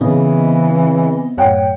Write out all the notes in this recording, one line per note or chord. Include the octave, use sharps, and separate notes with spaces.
C#3 E3 B3 C4 D#5
F#2 A2 C#5 F#5 G5